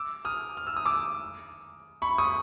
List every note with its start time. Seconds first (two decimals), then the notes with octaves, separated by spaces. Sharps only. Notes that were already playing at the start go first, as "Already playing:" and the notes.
Already playing: D6 E6
0.25 D#6 F6
0.57 F6
0.67 E6
0.76 D#6
0.86 D6 E6
2.02 B5 C#6
2.18 C#6 D#6